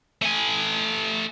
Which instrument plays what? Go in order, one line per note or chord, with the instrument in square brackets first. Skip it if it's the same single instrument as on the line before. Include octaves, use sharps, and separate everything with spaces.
[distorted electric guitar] A3 G#5